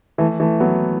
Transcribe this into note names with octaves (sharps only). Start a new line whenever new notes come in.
E3 A3
E3 A3
F#3 B3